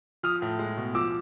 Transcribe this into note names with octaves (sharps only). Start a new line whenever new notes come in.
F3 D#6 F6
A2
G#3
B2
F3 D6 E6